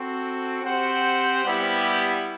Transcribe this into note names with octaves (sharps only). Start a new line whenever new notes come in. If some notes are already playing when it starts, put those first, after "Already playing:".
Already playing: C4 F#4 A4
C4 G4 C5 F#5
G3 B3 E4 G4